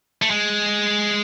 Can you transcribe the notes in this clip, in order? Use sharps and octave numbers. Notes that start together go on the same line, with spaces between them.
A3
G#3